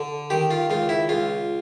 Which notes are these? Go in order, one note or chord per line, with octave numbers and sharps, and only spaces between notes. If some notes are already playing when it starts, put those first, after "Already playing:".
Already playing: D3
D#3 G4
F4
C#2 F4
E4
C#2 F4